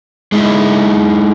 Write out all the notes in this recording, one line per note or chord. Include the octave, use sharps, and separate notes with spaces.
G#3 D#4 E4